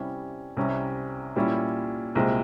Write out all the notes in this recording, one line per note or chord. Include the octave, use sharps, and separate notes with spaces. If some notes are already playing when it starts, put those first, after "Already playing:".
Already playing: C3 G3 C#4 E4
C2 C3 G3 C#4
A#2 G3 C#4 E4
C2 A#2 G#3 C4